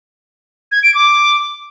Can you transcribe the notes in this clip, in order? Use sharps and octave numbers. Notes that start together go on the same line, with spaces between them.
G#6
D7
D6